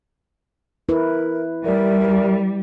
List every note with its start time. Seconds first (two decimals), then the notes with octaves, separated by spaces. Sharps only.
0.89 E4 A#4 B4
1.64 G3 A#4 D5 E5